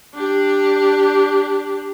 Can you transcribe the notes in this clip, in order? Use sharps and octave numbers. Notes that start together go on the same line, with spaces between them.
D4 G4